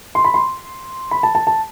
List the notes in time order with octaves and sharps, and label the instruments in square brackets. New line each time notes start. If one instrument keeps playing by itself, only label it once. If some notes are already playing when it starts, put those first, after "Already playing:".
[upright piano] C6
B5
C6
B5
A5
A5
A5